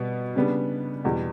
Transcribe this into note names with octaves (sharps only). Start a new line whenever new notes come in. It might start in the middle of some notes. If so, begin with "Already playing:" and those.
Already playing: B2 G3 B3
C#3 G3 B3 D4
E2 B2 G3